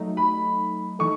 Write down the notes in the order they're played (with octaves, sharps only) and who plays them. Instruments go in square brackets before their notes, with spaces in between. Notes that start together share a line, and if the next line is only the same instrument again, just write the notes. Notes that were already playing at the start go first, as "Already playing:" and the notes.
Already playing: [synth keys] F#3 A3 D#4
[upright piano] B5
[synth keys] E3 A3 D#4 A4 [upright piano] C#6